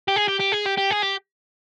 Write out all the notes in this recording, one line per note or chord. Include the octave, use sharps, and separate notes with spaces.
G4
G#4
G4
G4
G#4
G4
G4
G#4
G4